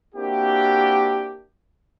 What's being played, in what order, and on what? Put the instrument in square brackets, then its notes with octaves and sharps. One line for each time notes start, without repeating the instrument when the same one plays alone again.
[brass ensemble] A#3 C4 D4 E4 F#4 G4